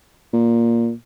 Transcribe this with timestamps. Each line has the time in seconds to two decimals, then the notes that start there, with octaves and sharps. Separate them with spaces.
0.33 A#2